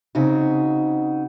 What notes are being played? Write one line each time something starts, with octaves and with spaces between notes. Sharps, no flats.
C#3 C4 D#4 F#4